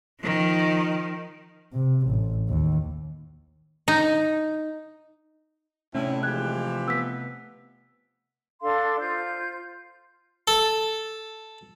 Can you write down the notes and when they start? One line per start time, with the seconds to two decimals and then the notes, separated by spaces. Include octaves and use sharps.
0.21 D#3 F3
1.73 C3
2.08 A1
2.49 D#2
3.88 D#4
5.95 A2 C3 A3 C#4 D4 E4
6.23 E3 F3 G#3 G4 F#6 G#6
6.88 B3 E6 B6
8.61 D4 A4 F5 C6
9.00 F4 C5 G6
10.48 A4